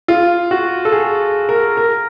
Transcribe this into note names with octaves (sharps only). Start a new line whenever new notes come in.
F4
F#4
A4
G#4
A#4
A#4